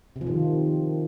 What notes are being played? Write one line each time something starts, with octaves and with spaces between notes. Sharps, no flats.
C3
F3
D#3